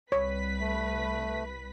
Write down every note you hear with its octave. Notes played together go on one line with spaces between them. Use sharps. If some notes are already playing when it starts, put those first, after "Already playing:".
C2 B4 C#5 B6
A3